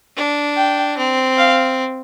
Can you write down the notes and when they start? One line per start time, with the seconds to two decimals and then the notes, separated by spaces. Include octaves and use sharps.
0.17 D4
0.56 G5
0.97 C4
1.38 F5